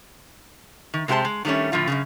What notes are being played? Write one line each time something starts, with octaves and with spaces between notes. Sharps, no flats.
D#3
C3 G#3 F#4 G4 C5 A5
G#3
D#3 F#3 G3 A3 C#4
A2 D3 F3 F4
F#2 A#2 C#3